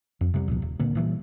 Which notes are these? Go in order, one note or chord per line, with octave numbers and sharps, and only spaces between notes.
F2
C3 G3
C#2 A#2 F3
D#1
A#2 D3 A#3
A#2 E3 G3